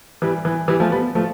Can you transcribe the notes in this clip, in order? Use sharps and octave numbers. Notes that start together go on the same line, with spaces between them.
E3 G3
E3
E3 G3
F3 A3
G3 B3
F3 A3